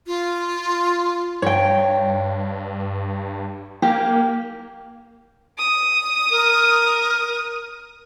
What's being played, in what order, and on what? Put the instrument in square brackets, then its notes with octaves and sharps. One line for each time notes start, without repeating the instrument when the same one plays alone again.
[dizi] F4
[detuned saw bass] G2 [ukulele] C#5 G5
[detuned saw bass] A#3 [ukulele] G4
[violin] D#6
[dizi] A#4